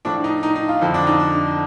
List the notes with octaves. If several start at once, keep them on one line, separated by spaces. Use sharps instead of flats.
A2 F3 D4
D#4
D#4
D#4
F4
F2 D3 F3
D4
D#4
D4